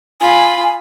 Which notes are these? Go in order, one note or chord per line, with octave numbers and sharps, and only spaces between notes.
F4 G#5 B5